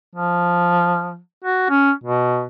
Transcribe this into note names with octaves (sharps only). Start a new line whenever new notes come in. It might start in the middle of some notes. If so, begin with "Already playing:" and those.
F3
F#4
C#4
B2